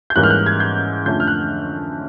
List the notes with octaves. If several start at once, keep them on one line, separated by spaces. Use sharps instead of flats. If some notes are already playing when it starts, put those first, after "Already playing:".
G6
G#2 E3 G3 A#3 C#4 F#6
F6
F#6
G#6
G6
F2 D3 F3 A3 C#4 G6
F6
F#6